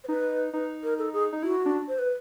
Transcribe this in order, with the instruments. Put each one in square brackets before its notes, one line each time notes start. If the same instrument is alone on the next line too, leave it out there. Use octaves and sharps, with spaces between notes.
[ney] C5
[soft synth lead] D#4 [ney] B4
[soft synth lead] D#4 [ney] B4
[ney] A#4
A4
G#4
[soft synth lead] D#4
[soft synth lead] E4 [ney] F#4
[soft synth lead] D4
[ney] C5
B4